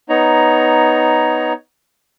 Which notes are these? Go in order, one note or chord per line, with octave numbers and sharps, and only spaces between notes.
B3 D#4 C#5 A#5